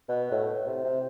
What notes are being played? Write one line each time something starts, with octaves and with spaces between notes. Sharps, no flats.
B2
A2
C3
C3